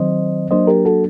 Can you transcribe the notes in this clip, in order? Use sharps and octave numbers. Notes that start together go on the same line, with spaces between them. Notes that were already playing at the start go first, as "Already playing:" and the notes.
Already playing: D#3 F#3 C4 C5 D#5
F#3 A#3 D4 C5 D#5
G4 A#4
F#4 A4